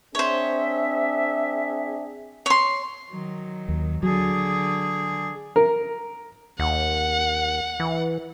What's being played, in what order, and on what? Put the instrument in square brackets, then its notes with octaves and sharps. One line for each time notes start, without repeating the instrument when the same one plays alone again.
[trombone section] C4 D4 G#4 [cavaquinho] C5 C#5 [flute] E5
[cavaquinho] C#5 C6
[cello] D#3 F#3
[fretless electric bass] D#2
[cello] D3 G#4 [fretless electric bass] F#3
[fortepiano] A#4
[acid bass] D#2 [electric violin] F#5
[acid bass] E3